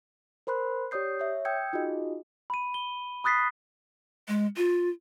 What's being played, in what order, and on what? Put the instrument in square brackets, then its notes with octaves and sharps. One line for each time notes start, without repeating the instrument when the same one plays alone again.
[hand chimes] A#4 C5 B5 C6 F#6
G4 C#5 D5 D#6 G6 C7
C#5 E5
G5 D#6 E6 G6 G#6 C#7
D#4 F4 F#4 G#4 D#5
[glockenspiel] B5 D#7
G7
B5 D#6 F#6 A6 B6 C7
[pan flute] G#3
F4